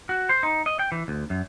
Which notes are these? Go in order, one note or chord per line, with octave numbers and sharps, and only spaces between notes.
F#4
C5
D#4
D#5
G5
E3
D2
F#2